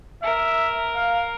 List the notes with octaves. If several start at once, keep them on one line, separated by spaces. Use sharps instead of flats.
A#4 E5
F5